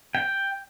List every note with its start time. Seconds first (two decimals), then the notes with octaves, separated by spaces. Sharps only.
0.15 G5